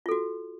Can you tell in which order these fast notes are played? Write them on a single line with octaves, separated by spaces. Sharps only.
F4 A4 F#4